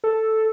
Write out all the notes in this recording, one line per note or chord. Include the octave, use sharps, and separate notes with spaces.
A4